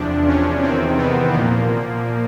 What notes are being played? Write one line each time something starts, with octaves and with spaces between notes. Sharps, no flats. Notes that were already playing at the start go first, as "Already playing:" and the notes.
Already playing: E2 C3 F3 D4
C#4
E2 C3 D#3 C4
B3
A#2 F3 A#3